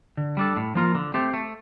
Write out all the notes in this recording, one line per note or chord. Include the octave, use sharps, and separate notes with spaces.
D3
G3 D4 A4
A2
F3 A#3 F4 A#4
D3
A3 C4 G4 C5
A3